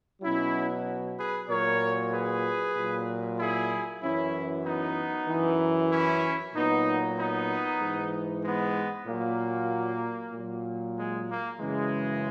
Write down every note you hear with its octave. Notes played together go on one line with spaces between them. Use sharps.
B2 F#3 C#4 E4
G#4 B4
A#2 F#3 A#4 C#5
G#4 B4
A#2 F#3
E4 G#4
F#2 E3 C#4 E4
B3 D#4
F#2 E3
C#4 E4
A#2 F#3 B3 D#4
B3 D#4
G#2 E3
G#3 B3
A#2 F#3 A#3
A#2 F#3
G#3
A#3
F#2 C#3 E3 G#3